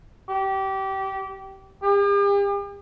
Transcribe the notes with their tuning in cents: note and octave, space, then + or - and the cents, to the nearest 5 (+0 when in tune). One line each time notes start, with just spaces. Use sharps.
G4 -25
G4 +45